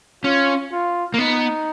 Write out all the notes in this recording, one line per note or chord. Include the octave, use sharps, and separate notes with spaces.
C#4 F4
F4
A#3
B3 D#4